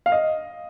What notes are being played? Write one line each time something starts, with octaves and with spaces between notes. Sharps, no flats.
F5
D#5